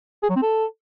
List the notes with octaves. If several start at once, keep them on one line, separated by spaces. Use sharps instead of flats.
G#4
F#3
C4
A4